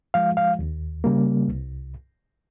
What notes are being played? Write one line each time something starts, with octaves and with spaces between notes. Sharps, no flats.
F3 G#3 F5
F5
D#2
C#3 G3 A#3
C2